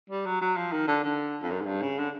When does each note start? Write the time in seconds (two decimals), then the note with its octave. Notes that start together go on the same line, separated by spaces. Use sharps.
0.10 G3
0.26 F#3
0.41 F#3
0.57 F3
0.72 D#3
0.87 D3
1.04 D3
1.42 F2
1.50 F#2
1.61 G#2
1.66 G2
1.82 C#3
1.98 D3